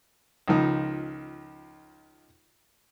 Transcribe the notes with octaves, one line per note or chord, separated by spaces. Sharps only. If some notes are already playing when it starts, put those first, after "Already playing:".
C#2 D#3 F3 D#4